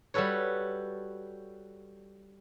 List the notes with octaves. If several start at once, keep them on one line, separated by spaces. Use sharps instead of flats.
G3 F#4 A4 B4 C#5